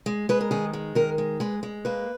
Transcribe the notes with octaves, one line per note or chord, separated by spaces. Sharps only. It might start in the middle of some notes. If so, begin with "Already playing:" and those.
G#3
G#3 B4
A#4
D#3 G#4
G#3
D#3 A#4
G#3
G#3 B4
G#3
A#3 B4